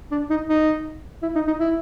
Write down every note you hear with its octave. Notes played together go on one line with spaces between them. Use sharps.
D4
D#4
D#4
E4
D#4
D#4
E4